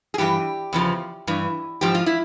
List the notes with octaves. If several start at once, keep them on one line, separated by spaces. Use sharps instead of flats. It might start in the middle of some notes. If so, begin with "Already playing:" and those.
G#4
G2 E3 G4
E2 C#3 F3
G2 E3
G#2 F3 G4
F4
E4